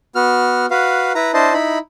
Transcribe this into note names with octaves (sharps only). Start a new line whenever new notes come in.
B3 F#4 F6
F#4 B4 F5
E4 B4 A#5
D4 E4 C5 D#5 A5
D#4 E4 B5